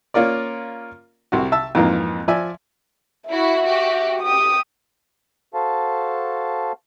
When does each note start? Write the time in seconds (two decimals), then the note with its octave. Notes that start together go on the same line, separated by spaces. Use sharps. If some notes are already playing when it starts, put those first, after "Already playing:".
0.14 A#3 C#4 F4 A#4 D5
1.32 C2 C3 F#4
1.52 E5 A5 E6
1.75 F2 G#2 E3 A#3 C4
2.28 F3 D5 E5 G#5
3.30 E4 F#4 E5
3.65 F#4 G4
4.23 G4 D#6
5.54 F#4 A4 C5 F5 A5